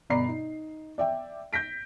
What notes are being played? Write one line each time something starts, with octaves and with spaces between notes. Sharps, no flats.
G1 B2 D5 A#5 B5 C7
D#4
D5 E5 G5
G6 A#6 B6 D7